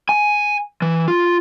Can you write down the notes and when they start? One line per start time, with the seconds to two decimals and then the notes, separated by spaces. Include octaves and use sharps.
0.09 G#5
0.82 E3
1.08 F4